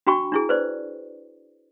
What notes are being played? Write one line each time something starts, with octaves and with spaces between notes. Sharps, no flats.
D4 F#4 G5 B5 C#6
D4 E4 G#4
B4 C5 D5